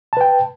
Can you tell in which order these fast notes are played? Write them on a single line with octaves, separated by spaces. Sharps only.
A5 B4 G5